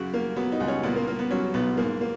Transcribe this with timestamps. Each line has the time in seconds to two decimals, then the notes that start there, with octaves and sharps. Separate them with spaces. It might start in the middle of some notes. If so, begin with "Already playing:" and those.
Already playing: F#2 C#3 F#4
0.14 A#3
0.36 F#3 B3
0.52 D#4
0.60 C#2
0.68 C#4
0.83 A#2 B3
0.96 A#3
1.07 A#3
1.19 B3
1.31 F#3 C#4
1.54 B1 B3
1.77 G#2 A#3
2.01 A#3